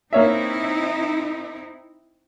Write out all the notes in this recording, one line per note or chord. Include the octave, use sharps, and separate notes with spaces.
A#3 C4 D#4 E4 C#5 E5